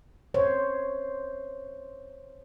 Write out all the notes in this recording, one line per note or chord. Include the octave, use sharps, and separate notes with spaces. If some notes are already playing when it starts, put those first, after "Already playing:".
C5 C#5